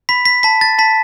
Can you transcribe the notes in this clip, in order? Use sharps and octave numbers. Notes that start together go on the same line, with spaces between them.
B5 B6
B6
A5 B6
A6
A5 B6